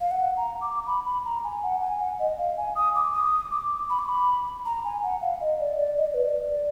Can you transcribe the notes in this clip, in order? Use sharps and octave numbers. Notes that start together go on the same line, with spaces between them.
F5
F#5
A#5
D6
B5
B5
A#5
G#5
F#5
G#5
F#5
D#5
F5
G#5
D#6
D6
D#6
D6
B5
D6
B5
A#5
G#5
F#5
F5
D#5
D5
D#5
D5
D#5
D5
B4
D5